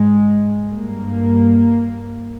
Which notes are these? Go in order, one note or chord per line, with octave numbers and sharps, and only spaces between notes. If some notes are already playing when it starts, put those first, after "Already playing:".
Already playing: G#2 G#3
G2 A#3